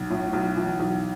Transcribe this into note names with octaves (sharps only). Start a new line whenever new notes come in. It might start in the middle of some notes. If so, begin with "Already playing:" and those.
Already playing: B1
A2
B1
E3
B1